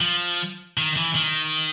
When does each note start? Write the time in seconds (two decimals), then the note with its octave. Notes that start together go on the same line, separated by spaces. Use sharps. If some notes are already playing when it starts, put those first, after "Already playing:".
0.01 F3
0.78 D#3
0.96 E3
1.15 D#3